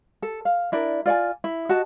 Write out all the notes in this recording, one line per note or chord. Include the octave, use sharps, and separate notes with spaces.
A4
F5
D4 E4 A#4 D5
F4 D5 F#5 G#5
E4
F#4 D#5 A5